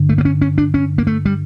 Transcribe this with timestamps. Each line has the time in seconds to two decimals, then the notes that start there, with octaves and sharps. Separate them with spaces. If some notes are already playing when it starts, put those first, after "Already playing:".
Already playing: G2 D3
0.09 A3
0.18 A#3
0.25 C#4
0.42 C#4
0.58 D4
0.74 C#4
0.98 A#3
1.07 A3
1.25 G3